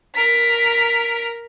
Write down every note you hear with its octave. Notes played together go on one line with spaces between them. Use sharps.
A#4 B6